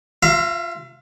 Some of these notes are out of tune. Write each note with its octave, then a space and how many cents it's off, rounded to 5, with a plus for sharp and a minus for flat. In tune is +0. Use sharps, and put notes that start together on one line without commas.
F4 +0 E5 +40 A#5 +0